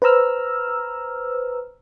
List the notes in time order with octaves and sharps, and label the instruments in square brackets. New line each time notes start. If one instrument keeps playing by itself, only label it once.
[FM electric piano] B4 C5 A#5 E6 F6